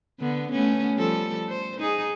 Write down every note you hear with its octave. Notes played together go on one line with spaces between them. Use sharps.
D3 B3
A3 B3 C#4
F3 G3 A4
C5
D#4 G#4